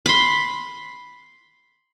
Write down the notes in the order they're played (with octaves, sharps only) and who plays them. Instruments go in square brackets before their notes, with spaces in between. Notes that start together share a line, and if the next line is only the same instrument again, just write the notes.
[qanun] B5 C6